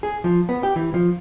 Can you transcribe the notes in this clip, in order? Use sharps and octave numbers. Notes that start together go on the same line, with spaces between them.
G#4
F3
B3
G4
E3
F3